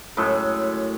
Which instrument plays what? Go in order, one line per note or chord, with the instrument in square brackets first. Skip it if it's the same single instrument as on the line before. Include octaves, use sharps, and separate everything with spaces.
[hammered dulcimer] F#2 A2 G#3 A4